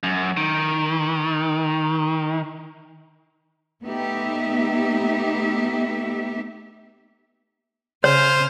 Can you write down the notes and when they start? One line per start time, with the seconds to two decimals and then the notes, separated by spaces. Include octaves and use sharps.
0.03 F#2
0.37 D#3
3.82 A3 B3 D#4 G4 E5
8.04 C#3 C5 C#5 G#5 F6